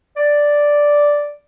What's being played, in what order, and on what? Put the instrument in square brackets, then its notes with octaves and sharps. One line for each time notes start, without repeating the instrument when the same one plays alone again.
[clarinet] D5